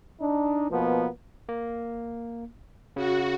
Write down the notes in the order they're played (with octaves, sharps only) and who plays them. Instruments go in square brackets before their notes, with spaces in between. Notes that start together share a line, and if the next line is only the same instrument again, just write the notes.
[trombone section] D4 D#4
B2 F3 A#3 B3
[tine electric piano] A#3
[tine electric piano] C#3 [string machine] F#4